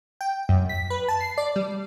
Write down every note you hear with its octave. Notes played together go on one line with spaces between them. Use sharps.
G5
F#2
B6
B4
A5
C7
D5
G3